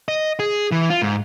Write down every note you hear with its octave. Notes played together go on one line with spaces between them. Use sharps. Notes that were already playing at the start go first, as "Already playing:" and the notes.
D#5
G#4
E3
F4
G#2